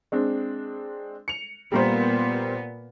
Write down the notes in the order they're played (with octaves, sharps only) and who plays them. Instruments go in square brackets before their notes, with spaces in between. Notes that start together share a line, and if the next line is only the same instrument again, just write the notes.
[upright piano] G#3 C4 D4
C#7 F7
[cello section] A#2 B3 [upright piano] G3 A#3 C5